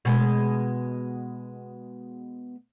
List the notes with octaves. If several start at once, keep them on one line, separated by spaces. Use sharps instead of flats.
B2 G#3